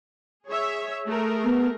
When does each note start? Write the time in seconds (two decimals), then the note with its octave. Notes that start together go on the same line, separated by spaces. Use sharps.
0.47 G#4 C#5 E5
1.06 A3 G#4 A#4
1.44 B3